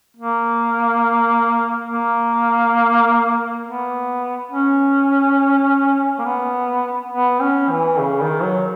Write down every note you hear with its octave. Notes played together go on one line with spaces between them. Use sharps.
A#3
A#3
B3
C#4
A#3
B3
B3
C#4
E3
C#3
D#3
F#3